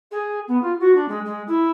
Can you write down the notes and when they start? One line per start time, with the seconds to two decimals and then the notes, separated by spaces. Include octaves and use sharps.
0.11 G#4
0.47 B3
0.62 F4
0.79 F#4
0.95 D4
1.08 G#3
1.25 G#3
1.47 E4